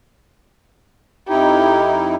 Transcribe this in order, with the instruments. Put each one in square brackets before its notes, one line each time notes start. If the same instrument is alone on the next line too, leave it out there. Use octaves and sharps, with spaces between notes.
[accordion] F2 D#4 E4 [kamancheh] G4